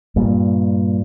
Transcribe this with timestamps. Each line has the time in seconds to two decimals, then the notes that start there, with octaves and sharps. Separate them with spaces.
0.16 G2 A#2